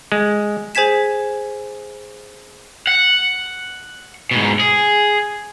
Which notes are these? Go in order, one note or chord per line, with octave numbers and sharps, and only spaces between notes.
G#3
G#4 C5 G#5 G#6 B6 E7
F#5
G#2 B2
G#4